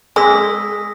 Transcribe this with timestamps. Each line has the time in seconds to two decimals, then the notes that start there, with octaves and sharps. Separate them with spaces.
0.16 G#3 G#4 D#6 E6 A#6 B6